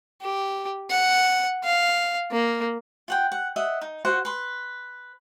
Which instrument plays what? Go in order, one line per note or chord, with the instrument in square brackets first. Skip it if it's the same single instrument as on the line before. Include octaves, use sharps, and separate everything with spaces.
[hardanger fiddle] G4
F#5
F5
A#3
[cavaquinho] F4 F#5 G5
F#5
D#5 E5 F#5
D#4
F4 F#4 C5 F#5
B4 C6